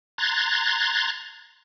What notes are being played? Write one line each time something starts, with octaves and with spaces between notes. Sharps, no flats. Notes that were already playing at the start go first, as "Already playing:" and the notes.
A#5 C6 F#6 G#6 A6